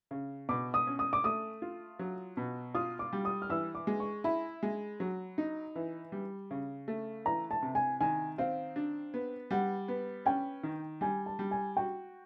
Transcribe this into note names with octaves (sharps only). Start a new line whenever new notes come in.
C#3
B2 D6
D#6
C#4
D#6
D6
A3 D#6
F4
F#3
B2
F4 D#6
D6
G3
D#6
F6
E3 E6
D6
G#3
C#6
E4 B5
G#3
F#3
D#4
E3
G3
C#3
A3
E3 A#5
A5
C3
G#5
D#3 G#5
C4 F5
D4
B3
G3 F#5
B3
C#4 G5
D#3
G3 G#5
A5
G3
G#5
F#4 G5